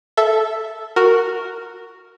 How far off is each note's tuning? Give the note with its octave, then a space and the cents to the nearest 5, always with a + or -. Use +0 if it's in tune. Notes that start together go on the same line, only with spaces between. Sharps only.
A4 -5 E5 +0
F#4 +0 A#4 -10